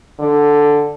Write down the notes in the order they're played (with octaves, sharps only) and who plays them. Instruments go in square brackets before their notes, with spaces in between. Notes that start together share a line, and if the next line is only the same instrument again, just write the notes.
[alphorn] D3